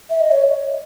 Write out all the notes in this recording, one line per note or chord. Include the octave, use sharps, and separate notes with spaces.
E5
D#5
C#5